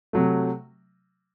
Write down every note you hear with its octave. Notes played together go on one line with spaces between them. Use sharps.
C3 F#3 A3